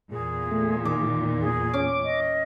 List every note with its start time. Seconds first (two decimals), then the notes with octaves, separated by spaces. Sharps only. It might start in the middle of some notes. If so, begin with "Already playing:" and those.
0.11 E2 A#2 G#4
0.51 A3
0.85 D#3 D6
1.41 G#4
1.74 C#4 D6
2.04 D#5